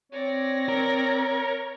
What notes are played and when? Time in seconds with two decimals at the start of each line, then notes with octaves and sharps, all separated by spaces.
0.12 C4 C#5 D5 A#6
0.69 A#4